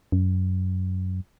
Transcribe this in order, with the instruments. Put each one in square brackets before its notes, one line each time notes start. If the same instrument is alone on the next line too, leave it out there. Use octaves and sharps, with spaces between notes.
[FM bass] F#2